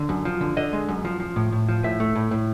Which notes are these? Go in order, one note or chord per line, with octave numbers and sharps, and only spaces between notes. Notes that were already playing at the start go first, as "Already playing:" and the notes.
Already playing: D3
F#2
F3
D3
D3 D#5
G#3
F#2
F3
F3
A2
A2
F3
A2 E5
A3
A2
A2